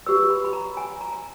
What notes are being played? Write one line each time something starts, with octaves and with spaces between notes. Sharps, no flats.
G4 B4 E6
B5
B5
A#5
G#5
A#5